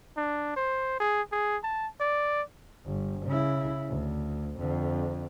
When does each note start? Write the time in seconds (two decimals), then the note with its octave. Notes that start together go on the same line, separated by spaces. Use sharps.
0.17 D4
0.56 C5
1.00 G#4
1.32 G#4
1.63 A5
2.00 D5
2.86 G1
3.26 C#3 E4
3.88 D2
4.59 F2 D3